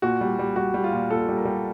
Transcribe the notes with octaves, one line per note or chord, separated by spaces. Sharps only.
A#2 F#4
G3
G3
G3 F#4
G3
F4
A#2
A#2 A4
G3
A#4
G3